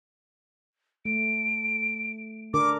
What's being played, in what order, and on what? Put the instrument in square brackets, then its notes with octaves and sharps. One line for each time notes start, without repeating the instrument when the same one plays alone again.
[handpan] A3 [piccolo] D7
[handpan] D3 D4 A#4 [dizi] D6